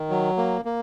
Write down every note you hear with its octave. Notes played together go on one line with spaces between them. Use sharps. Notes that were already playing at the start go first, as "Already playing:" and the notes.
Already playing: D#3
F#3
A#3
A#3